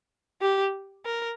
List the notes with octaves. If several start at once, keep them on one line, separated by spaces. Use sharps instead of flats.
G4
A#4